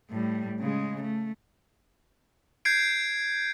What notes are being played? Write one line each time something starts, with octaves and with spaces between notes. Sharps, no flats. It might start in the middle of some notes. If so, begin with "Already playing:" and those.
A2 G3
C#3 G#3
A3
G6 G#6 C7 D7